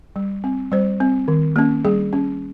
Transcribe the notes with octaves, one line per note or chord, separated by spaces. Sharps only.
G3
C4
G3 C5
C4
D#3
A#3 C#4
G3 G#4
C#4